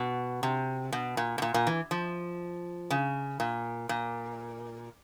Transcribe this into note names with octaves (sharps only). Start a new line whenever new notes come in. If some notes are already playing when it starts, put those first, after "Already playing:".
Already playing: B2
C3
B2
A#2
B2
A#2
A#2
E3
F3
C#3
A#2
A#2